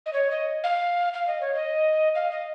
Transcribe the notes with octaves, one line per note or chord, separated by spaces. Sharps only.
D#5
C#5
D#5
F5
F5
D#5
C#5
D#5
F5
D#5